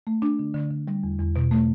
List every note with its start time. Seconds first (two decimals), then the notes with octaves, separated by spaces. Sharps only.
0.07 A3
0.22 D4
0.39 D3
0.54 D3
0.71 D3
0.88 G3
1.03 E2
1.19 E2
1.36 B2
1.51 A3